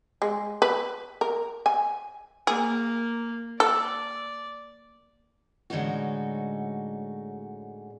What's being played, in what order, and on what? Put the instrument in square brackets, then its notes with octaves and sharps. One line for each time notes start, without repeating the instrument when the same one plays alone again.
[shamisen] G#3
B4
A#4
G#5
[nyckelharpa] A#3 [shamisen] G#4
[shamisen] A4 [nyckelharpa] D5
[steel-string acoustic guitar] A2 D3 G#3 C#4 D#4 F#4